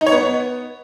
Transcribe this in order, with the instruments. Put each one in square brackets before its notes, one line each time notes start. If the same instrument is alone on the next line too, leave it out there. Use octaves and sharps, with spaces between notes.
[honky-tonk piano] D#4
C#5
B3